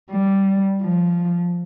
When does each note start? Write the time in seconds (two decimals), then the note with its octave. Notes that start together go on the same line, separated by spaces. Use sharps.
0.11 G3
0.81 F3